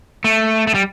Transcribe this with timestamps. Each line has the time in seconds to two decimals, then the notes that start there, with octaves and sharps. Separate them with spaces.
0.24 A3
0.67 A3
0.75 G3